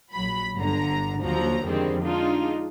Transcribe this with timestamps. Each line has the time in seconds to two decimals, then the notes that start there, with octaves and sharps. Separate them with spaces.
0.13 A#1 F#3 B5
0.56 G1 D3 A#5
1.20 D#2 D3 F3 F#3 A#5
1.67 F2 D3 D#3 G3 G#3 C4
2.03 G#3 D4 D#4 F4